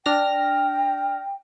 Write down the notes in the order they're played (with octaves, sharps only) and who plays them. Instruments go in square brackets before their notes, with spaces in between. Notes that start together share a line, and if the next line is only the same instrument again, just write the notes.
[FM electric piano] D4 F6 A#6 [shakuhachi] G5